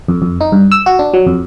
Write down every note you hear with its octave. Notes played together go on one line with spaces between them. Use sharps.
F2
F2
D#4
G2
E6
F#4
D4
F#3
F2